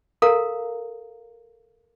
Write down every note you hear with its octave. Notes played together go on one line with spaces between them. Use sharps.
A4 A#4 F5 A#5